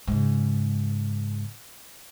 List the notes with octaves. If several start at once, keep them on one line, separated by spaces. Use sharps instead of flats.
G#2 C#3